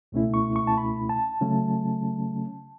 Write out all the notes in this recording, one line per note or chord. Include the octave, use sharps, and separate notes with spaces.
C#2 B2 A3 C#4 E4
C#6
C#6
A5
B5
A5
C#3 F#3 A3 C#4